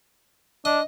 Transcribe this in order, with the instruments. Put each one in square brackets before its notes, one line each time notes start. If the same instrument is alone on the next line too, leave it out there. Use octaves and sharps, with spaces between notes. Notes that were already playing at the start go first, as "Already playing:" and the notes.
[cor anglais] D4 [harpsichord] D#5